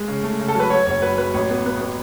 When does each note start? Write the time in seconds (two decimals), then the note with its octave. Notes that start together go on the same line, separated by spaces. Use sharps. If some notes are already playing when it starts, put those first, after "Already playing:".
Already playing: G#3
0.08 C#3
0.24 A3
0.40 C#3
0.48 A4
0.55 F#3 B4
0.70 F#3 C#5
0.86 F#1 C#5
1.02 F#3 B4
1.18 F#3 B4
1.34 A1 C#5
1.50 B3
1.66 B3
1.81 B3